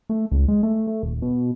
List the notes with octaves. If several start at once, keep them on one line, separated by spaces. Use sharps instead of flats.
A3
C#2
G#3
A3
A3
D#1
B2